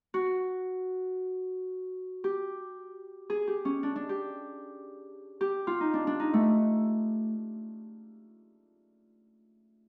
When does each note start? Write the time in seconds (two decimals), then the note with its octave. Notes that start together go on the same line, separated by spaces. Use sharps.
0.14 F#4
2.24 G4
3.30 G#4
3.47 G4
3.65 C#4
3.83 D4
3.96 D4
4.09 G4
5.41 G4
5.67 F4
5.80 D#4
5.94 D4
6.07 D4
6.20 D#4
6.34 A3